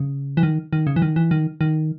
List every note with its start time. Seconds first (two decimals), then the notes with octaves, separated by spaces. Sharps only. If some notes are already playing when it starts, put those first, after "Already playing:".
Already playing: C#3
0.37 E3
0.43 D#3
0.73 D#3
0.87 C#3
0.96 E3
1.02 D#3
1.16 E3
1.31 D#3
1.61 D#3